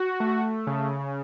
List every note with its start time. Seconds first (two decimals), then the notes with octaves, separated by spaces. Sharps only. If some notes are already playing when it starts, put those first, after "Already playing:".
Already playing: F#4
0.20 A3
0.67 C#3